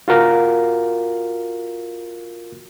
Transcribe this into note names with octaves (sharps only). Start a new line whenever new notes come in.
F4 F#4 A#4 F5